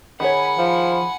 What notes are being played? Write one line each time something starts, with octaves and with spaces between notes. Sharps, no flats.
D#3 G#4 C#5 F#5 G#5 B5
F3